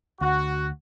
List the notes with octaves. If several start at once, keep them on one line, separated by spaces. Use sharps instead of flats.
D2 F#4